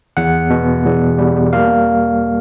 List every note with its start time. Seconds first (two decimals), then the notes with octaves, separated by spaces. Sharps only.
0.17 E2 F#5
0.50 B2
0.85 E2
1.18 G3
1.53 A#3 F5